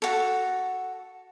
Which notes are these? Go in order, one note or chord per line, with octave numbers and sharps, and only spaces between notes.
F#4 A4